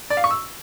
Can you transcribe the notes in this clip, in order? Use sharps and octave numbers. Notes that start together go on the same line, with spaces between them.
D5
F5
C#6
E6